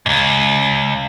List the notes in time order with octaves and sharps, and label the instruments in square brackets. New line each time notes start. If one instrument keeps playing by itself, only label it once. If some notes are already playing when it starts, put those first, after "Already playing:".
[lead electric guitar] C#2 G#2